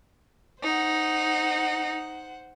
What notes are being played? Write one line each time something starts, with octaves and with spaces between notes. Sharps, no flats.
D#4 C5 F#5